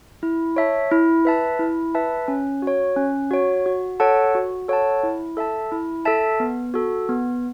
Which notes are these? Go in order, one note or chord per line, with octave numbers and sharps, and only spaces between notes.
E4
C#5 E5 A5
E4
B4 E5 A5
E4
B4 E5 A5
C#4
F#4 C#5
C#4
F#4 C#5
F#4
A4 C#5 F#5 A5
F#4
A4 C#5 F#5 A5
E4
A4 E5 A5
E4
A4 E5 A5
B3
F#4 A4
B3